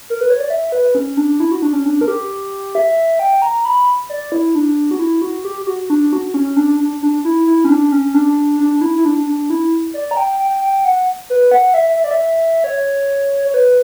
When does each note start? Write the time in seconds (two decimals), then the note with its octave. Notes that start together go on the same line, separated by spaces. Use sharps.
0.10 A#4
0.21 B4
0.30 C#5
0.40 D5
0.50 E5
0.72 B4
0.95 C#4
1.17 D4
1.40 E4
1.52 F#4
1.62 D4
1.73 C#4
1.85 D4
2.01 A#4
2.08 G4
2.75 E5
3.19 G5
3.42 A#5
3.65 B5
4.09 D5
4.32 E4
4.55 D4
4.91 F#4
4.99 E4
5.22 F#4
5.45 G4
5.61 G4
5.67 F#4
5.90 D4
6.13 F#4
6.34 C#4
6.56 D4
6.80 D4
7.03 D4
7.25 E4
7.47 E4
7.64 C#4
7.70 D4
7.92 C#4
8.14 D4
8.60 D4
8.81 E4
8.97 E4
9.05 D4
9.27 D4
9.50 E4
9.94 D5
10.11 A#5
10.17 G5
10.40 G5
10.62 G5
10.85 F#5
11.30 B4
11.51 F#5
11.74 E5
11.96 E5
12.04 D5
12.11 E5
12.64 C#5
13.45 C#5
13.54 B4